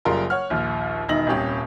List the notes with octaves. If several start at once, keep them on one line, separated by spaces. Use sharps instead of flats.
F#1 C#3 G3 F4 A#4
C#5 F#5 F6
A#1 D#2
E1 D#3 D#4 E5 A#6 F#7
D#1 C2 C#4 G4